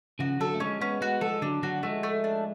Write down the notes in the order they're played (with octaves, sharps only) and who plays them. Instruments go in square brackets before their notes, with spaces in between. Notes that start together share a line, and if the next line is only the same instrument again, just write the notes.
[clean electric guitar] C#3 F3 [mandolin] F#4
[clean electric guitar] D3 F#3 [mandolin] A4
[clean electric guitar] A3
[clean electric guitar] F3 G#3 [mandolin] C#4
[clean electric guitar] G#3 B3 [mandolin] C#4
[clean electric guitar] G#3 B3 [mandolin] F#4
[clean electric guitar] F3 G#3 [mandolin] A4
[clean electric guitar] D3 F#3 [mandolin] D4
[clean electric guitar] D3 F#3 [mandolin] F#4
[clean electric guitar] F3 G#3 [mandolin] A3
[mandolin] A3
D4